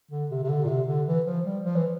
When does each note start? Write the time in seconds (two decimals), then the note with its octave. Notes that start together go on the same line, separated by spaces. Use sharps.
0.11 D3
0.31 C3
0.43 C3
0.49 D3
0.64 A#2
0.68 C3
0.88 D3
1.07 E3
1.26 F3
1.45 G3
1.64 F3
1.76 E3